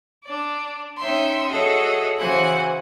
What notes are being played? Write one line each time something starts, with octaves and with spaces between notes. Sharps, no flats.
D4 D5
C#4 D#4 E5 G5 C6
F#4 G#4 A4 C#5 D#5 E5
C#3 E3 F#4 C5 G#5 F#6